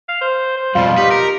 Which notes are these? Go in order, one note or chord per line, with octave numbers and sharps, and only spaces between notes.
F5
C5
C5
F2 B2 G3 F4
D#4 G4 B4
A#4